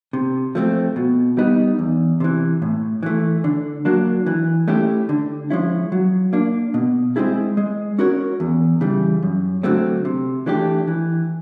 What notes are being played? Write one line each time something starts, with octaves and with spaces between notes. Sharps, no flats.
C3
F3 A3 C4
B2
G3 B3 D#4
E2
C3 E3
A2
E3 A3
D3
F#3 A#3 D4
E3
A3 C#4 E4 G4
D3
F3 G#3 C#4 E4
F#3
A#3 D4
B2
G#3 C4 E4 G#4
G#3
C#4 F#4 A#4 C#5
E2
C#3 E3 G3
F#2
D3 F#3 A3 C4
C3
E3 A3 D4 G4
E3